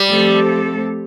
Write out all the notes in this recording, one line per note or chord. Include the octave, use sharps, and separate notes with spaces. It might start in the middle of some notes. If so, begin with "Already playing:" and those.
Already playing: G3
F3 A3 C4 A4